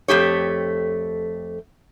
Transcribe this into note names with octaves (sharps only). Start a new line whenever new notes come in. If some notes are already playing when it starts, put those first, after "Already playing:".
F2 A3 G4 C#5